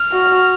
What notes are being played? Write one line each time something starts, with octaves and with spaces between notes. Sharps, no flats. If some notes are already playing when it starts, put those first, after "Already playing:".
Already playing: F6
F#4